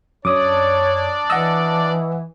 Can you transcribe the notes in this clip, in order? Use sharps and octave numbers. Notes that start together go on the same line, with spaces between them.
F#2 D4 C#5 D5 D6 D#6
E3 D#5 F#5 E6